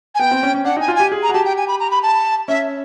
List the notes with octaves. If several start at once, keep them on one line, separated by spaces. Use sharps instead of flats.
G#5
B3 G5
C4
C#4
C#4
D4 F#5
D#4 G#5
F4
G4 G#5
G#4
A#5
F#4
G4 A5
G5
G#5
B5
A#5
B5
A5
C#4 E5